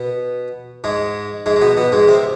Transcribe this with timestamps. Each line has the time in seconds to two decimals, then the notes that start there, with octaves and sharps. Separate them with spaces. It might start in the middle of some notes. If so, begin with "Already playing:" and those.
Already playing: B2 B3
0.84 G#2 G#3
1.46 G#2 G#3
1.56 G#3
1.61 B2 B3
1.77 B2 B3
1.92 G#2 G#3
2.08 C3 C4